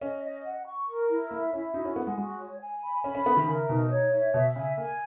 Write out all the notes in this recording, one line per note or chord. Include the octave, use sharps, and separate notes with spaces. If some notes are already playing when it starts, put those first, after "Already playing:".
C#4 D#5
D#5
F#5
C#6
A#4
E4
A#3 E5
C#4 E4
D#4 F#4
C#4
B3 F#5
G#3
G#3 F#4
C#5
G#5
B5
C#4 B5
C#4
B3 E5
D#3
C#3 A#4
B2 D#4
C#5
E5
B2 E5
C#3 G#5
A#3 G#5